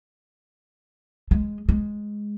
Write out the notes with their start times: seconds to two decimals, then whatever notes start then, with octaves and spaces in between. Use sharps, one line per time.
1.31 G#3
1.69 G#3